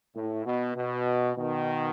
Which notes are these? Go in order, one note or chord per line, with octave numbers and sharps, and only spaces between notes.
A2
B2
B2
B2 D#3